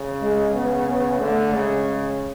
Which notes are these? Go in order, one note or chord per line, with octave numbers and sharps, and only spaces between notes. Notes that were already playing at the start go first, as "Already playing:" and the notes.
Already playing: C#3
G#3
B3
B3
D3 A3
C#3 G#3